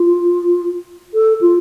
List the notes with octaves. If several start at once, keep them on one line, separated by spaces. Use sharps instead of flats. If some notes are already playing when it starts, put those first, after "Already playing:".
Already playing: F4
A4
F4